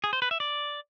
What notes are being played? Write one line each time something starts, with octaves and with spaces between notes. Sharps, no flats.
G#4
C5
B4
E5
D5